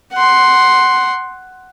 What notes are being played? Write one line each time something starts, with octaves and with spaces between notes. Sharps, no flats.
F#5 C6